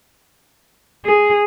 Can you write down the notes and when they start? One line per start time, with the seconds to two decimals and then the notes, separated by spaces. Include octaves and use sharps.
1.05 G#4